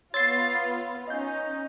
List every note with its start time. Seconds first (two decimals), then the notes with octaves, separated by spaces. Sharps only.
0.14 B3 F4 C#5 C6 E6 A6 C7
1.08 C#4 D#4 D#5 G6